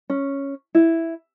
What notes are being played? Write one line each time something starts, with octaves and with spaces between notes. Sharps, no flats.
C#4
E4